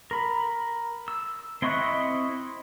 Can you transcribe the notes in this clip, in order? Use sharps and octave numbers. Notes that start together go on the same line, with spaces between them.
A#4 B5
E6
C4 E4 D#5 C#6 F#6